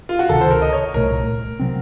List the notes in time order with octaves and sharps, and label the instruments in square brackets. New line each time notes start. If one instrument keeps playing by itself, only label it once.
[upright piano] F4
F#4
[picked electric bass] C#2 C3 D#3 [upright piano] A4
[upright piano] C5
A#4
D#5
C#5
[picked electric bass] C2 A#2 F#3 A3 [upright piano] A#4
[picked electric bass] C3 F#3 C4